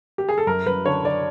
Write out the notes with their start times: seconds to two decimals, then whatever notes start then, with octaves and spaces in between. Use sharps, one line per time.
0.18 G4
0.29 G#4
0.38 A4
0.47 F#2 A#4
0.66 F#2 B4
0.85 D3 C#5
1.05 D3 D5